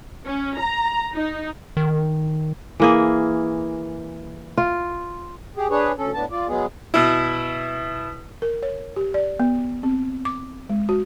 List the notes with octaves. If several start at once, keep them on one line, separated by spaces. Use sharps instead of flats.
C#4
A#5
D#4
D#3
E3 A#3 G#4
F4
G4 G#4
D4 G#4 B4 C#5
D2 C#4 A4
A2 B3 D4 A5
F4 D5
F#3 G#3 B3 G#4
B2 E4
A#4
C#5
G4
D5
B3
C4
D6
G#3
F#4